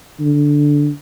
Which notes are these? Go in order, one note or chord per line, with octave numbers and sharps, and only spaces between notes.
D3